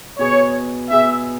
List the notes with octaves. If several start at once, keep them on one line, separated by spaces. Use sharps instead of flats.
B2 B3 G#4 C#5
B2 B3 G#4 E5